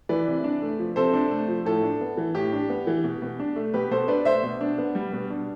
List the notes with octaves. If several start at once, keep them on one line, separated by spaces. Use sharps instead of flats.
E3 B4 D5
C3
D4
A3
F3
C3 A4 C5
D4
A3
F3
A2 A4
D4
B3
E3
A2 G4
D4
B3
E3
B2
B2
D4
A3
B2 G4 B4
B2 A4 C5
D4 B4 D5
A3 C5 E5
B2
D4
B3
G3
B2
D4